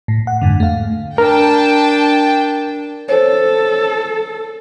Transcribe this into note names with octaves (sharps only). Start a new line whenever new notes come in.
A2
F#5
F2 G#2 D3
A3 F5
D4 A#4 G5 A5
A4 C5 C#5